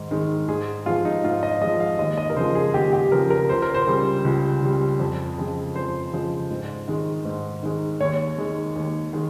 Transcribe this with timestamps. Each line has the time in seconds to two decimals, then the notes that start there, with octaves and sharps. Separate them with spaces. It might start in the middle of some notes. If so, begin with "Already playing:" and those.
Already playing: G#2 D#3
0.11 D#3 G#3
0.48 G#2 G#4
0.86 F3 G#3 F4
1.05 D#4
1.24 G#2 F4
1.43 D#5
1.61 F3 G#3 D#5
1.80 F5
1.99 D#2 D#5
2.18 D#5
2.30 A#4
2.36 C#3 F3 G#3 C5
2.55 G#4
2.74 D#2 G4
2.93 G4
3.12 C#3 F3 G#3 A#4
3.30 A#4
3.49 C#2 C5
3.62 A#4
3.74 C5
3.87 C#3 G3
4.25 C#2
4.62 C#3 G3
5.00 F2
5.38 C#3 F3 G#3
5.75 F2 C5
6.13 C#3 F3 G#3
6.50 G#2
6.88 D#3 G#3
7.25 G#2
7.63 D#3 G#3
8.00 D#2 C#5
8.38 D#3 G#3
8.76 D#2
9.13 D#3 G#3